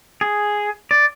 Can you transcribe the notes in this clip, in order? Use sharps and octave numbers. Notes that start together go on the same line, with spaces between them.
G#4
D5